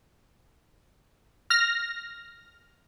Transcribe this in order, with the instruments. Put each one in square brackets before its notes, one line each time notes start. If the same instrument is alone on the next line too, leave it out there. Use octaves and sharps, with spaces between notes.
[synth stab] F6 A#6